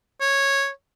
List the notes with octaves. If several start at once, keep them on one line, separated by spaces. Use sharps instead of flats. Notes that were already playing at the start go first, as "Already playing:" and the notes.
C#5